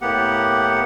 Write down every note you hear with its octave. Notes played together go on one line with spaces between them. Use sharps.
A2 A#3 B3 G4 F#5